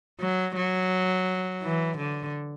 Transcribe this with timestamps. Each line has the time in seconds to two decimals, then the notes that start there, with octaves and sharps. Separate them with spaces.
0.20 F#3
0.57 F#3
1.63 E3
1.98 D3